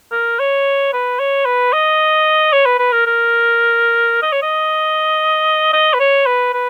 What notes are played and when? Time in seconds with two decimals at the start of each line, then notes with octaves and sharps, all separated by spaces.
0.12 A#4
0.39 C#5
0.93 B4
1.19 C#5
1.45 B4
1.73 D#5
2.52 C#5
2.66 B4
2.79 B4
2.92 A#4
3.07 A#4
4.22 D#5
4.32 C#5
4.42 D#5
5.73 D#5
5.94 B4
6.00 C#5
6.26 B4
6.53 B4